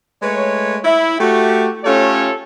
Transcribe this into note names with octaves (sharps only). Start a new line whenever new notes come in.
G#3 A3 B4 C#5
E4
A3 F#4 G4
A3 C#4 F4 G4 A4 C#5